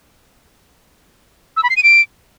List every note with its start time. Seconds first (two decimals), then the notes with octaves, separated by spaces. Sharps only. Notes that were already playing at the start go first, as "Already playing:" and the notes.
1.57 E6
1.63 B5
1.70 C7
1.77 D#7
1.83 D7